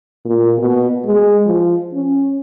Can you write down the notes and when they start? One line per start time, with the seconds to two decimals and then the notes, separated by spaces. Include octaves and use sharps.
0.25 A#2
0.58 B2
1.05 G#3
1.46 F3
1.94 C#4